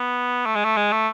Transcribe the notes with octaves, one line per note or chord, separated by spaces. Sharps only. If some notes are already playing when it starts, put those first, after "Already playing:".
Already playing: B3
A3
G#3
A3
G#3
A3